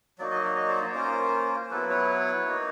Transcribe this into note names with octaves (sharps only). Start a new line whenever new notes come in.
F#3 A#3 D#4 F#4 D5
D#5
D5
D#5
C5 D5
C#5
A#3 C#4 F4 A#4 C5
C5
F#3 B3 E4 A4 B4
B4 C#5
A#3 D#4 F#4